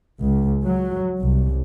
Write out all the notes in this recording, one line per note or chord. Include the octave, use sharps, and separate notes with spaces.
C#2
F#3
C2